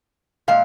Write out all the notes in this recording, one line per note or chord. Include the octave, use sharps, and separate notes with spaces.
A#2 G#3 F5